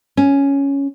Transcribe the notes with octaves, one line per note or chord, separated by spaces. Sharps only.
C#4